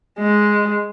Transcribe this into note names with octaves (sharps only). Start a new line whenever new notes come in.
G#3